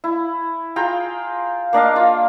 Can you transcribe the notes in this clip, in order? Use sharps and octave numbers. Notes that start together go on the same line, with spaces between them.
E4
F4 G#4 G5 A#5
A#3 D4 D#5 F5
F4